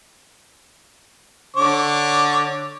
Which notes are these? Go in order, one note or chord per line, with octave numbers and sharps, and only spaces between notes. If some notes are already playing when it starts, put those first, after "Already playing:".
D3 C#5 D6